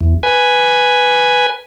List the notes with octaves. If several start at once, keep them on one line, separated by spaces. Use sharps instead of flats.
E2
B4 G#5